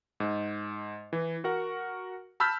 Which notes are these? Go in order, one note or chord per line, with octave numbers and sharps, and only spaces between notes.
G#2
E3
F#4 A#4 F#5
A5 B5 E6 F6 G6 B6